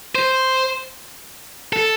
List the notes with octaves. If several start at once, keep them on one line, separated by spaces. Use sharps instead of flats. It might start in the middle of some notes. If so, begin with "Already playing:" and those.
C5
A4